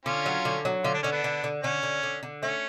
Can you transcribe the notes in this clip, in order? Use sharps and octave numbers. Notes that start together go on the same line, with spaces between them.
D3 C#4 F4
F#3
D3
F#3
D3 F4
D4
D3 C#4
B3 D4
D3
D3
D3 C#4
D3
D3
D3
A3 C#4